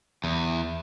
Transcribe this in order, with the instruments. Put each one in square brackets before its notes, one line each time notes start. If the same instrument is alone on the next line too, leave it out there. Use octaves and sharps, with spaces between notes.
[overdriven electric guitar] E2